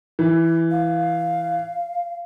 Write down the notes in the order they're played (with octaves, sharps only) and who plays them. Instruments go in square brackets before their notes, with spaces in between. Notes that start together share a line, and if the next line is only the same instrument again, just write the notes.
[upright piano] E3
[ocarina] F5